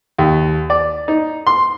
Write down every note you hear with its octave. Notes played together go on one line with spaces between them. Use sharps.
D#2
D5
D#4
C6